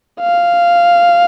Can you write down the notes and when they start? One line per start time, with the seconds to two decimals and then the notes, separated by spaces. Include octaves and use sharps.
0.21 F5